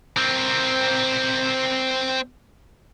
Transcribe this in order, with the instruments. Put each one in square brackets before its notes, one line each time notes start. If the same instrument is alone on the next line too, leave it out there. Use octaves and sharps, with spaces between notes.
[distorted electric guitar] C4 A#4